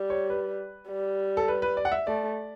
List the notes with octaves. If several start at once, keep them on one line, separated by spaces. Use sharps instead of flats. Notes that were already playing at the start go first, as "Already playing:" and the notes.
Already playing: G3
C#5
B4
G3
A4
B4
B4
D5
F#5
E5
A3 D5